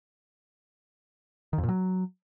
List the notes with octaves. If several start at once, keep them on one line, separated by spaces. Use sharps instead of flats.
D#3
F2
A#2
F#3